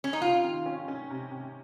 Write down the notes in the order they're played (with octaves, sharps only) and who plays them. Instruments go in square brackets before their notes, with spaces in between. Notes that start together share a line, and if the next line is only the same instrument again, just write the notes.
[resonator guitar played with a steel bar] C#4
D#4
[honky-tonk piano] C3 [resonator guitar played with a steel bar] F4
[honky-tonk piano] D#3
C#4
C#4
C3
C3